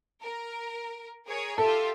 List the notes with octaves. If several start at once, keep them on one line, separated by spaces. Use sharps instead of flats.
A#4
G#4 A#4 C#5
F4 G4 A4 E5